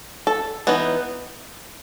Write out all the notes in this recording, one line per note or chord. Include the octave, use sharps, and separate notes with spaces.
A4
E3 B3 D#4